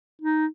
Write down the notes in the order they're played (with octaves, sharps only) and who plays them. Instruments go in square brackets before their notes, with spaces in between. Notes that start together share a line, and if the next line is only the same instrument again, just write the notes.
[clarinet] D#4